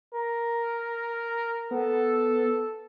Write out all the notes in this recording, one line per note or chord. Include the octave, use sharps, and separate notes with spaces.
A#4
B3 A4